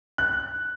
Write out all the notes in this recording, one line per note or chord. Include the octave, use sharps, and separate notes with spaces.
F#6